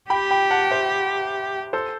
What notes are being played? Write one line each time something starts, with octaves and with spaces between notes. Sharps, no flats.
G4 G5 B5
G5 B5
F#5 A5
C5 E5
A4 C5